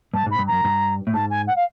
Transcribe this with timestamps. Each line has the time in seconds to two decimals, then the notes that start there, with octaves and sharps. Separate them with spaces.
0.14 G2 A5
0.26 G#2
0.31 B5
0.39 G2
0.47 F#2 A#5
0.64 G2
1.07 A2
1.13 G#2 A5
1.30 G#5
1.47 F#5
1.56 F5